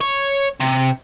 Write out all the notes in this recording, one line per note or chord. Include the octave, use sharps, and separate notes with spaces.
C#5
C3